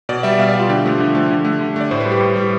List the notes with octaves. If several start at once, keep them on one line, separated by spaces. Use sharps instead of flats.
B2 D5
G3 E5
B2 F5
D5
G3
F4
D3 G4
F3 A3
D3
F3 A3
D3
A3
D3
A3 D5
A2 C5
B4
G3
G4
A2
G3